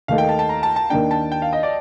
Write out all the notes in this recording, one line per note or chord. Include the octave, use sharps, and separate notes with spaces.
D#2 D#3 A3 D#4 A4 F5
G5
A5
A5
A#5
A5
A5
D#2 D#3 A#3 D4 G5
A5
G5
F5
D#5
D5